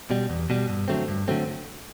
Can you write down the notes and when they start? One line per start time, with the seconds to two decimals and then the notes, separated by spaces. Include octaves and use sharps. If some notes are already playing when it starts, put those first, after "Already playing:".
0.11 B2 G3
0.30 E2
0.50 B2 G3
0.69 G2
0.88 D3 F#3 A3 C4
1.08 G2
1.28 D3 F#3 A3 C4